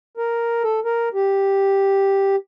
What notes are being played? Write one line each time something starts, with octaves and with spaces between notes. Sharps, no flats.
A#4
A4
A#4
G4